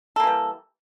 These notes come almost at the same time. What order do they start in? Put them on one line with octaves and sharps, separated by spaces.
A4 A#3 E3 G3